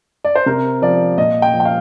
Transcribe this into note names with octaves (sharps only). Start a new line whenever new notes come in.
D5
C5
C3 A#4
F3 D5
A#2 D#5
G5
F3
G5
F5